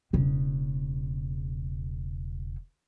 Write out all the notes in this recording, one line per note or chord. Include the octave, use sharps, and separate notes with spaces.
E1 C#3